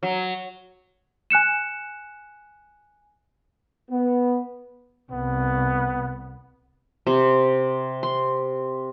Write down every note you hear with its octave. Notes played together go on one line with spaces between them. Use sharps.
F#3
G#5 F#6 C#7 E7
B3
C2 B3
C3
C6